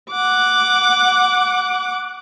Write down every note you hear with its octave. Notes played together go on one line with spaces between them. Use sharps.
F#5 D6